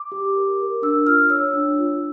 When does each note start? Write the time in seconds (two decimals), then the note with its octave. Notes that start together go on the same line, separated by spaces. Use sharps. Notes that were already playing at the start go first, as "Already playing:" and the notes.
Already playing: D6
0.12 G4
0.35 A#4
0.60 A#4
0.82 D4 E6
1.06 F4 F6
1.30 C#5 E6
1.54 D4
1.78 F4